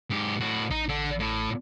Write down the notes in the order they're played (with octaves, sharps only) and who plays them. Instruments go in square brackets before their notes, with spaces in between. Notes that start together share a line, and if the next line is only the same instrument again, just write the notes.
[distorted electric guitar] G#2 G4
A2 F#4
[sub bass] A1 [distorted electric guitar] D#4
[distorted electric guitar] D3
A2